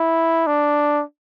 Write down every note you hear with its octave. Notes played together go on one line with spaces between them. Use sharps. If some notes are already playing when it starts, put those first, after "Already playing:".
Already playing: E4
D4